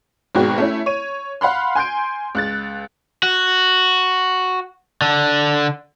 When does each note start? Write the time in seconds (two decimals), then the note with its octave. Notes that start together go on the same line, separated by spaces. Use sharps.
0.35 G#1 G#2 B2 G#3 F#4 G5
0.58 A3 C#4 E4
0.86 C#5 D#7
1.41 F5 F#5 B5 C6
1.75 G#5 C6 G6 D7
2.35 C#2 F#6 A6
3.23 F#4
5.02 D3